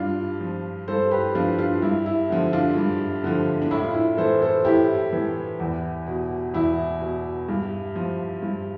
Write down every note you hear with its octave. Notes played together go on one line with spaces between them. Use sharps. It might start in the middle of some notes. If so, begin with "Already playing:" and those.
Already playing: G2 D4 F4
F3
G2 A4 C5
G4 B4
F3 D4 F4
D4 F4
G2 E4
E4
D3 F3
D4 F4
G2
D3 F3
D4
A2 E4
F4
E4
E3 A4 C5
A4 C5
A2 E4 G4
E3
E2
B2
E2 E4
B2
G2
F3
G2